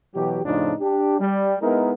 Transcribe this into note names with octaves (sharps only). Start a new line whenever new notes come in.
B2 E3 F#3 G4
F2 A2 C#3 F3 D4 D#4
D4 G4
G3
G#3 B3 D#4 E4 A#4